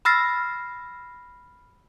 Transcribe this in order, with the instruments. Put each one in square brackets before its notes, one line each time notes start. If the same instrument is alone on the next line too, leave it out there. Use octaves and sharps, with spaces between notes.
[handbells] B5 E6 F6 A6 A#6 C7